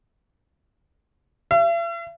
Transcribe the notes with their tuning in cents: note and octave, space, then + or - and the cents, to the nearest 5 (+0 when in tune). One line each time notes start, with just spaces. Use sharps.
E5 +45